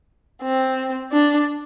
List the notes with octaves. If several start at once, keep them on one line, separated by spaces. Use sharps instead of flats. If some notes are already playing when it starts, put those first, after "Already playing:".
C4
D4